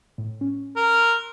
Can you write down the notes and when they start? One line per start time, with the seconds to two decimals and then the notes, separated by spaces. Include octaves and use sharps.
0.18 A2
0.41 C#4
0.76 A#4
1.01 C6 E6 F#6